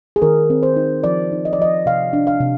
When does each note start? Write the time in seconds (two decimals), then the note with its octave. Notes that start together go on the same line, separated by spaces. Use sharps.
0.16 G#4
0.22 D#3 A#4
0.50 C4
0.63 C5
0.76 D#4
1.04 F3 D5
1.32 D#4
1.45 D#5
1.53 D5
1.59 F3 D#5
1.86 C3 F5
2.13 D4
2.27 F5
2.40 C3